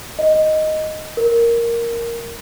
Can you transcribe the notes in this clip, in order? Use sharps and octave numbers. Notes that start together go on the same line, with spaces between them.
D#5
A#4